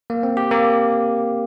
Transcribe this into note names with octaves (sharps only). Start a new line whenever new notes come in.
A#3
C4
G4
A#3